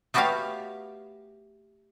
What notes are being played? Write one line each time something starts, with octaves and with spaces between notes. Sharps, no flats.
A3 B3 F#4 G4 C#5 F5